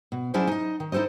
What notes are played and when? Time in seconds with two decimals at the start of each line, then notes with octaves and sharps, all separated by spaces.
0.12 B2
0.34 F#3 C#4 D4 E4 G#4 C5
0.47 D#4 D#5
0.80 D#3
0.92 D#4 E4 A4 C5 D#5